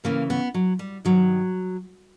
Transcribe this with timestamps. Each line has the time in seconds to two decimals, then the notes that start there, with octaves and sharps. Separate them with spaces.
0.04 D2 C#3 E3 A#3
0.30 B3
0.54 F#3
0.79 G3
1.05 G2 D#3 F#3